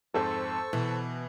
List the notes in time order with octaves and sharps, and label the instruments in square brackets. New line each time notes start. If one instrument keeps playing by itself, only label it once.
[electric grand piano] F2 G#2 C4 [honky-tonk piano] A4 C5 [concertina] A5 C#6 E6
[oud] B2 [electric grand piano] E3